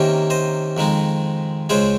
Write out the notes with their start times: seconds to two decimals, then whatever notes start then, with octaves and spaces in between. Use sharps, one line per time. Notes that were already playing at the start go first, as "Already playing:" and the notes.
Already playing: C3 D#3 A#3 C#4 C5 D#5
0.30 C5 D#5
0.77 F2 D#3 G#3 D#4
1.69 C#2 C#3 G#3 G#4 C5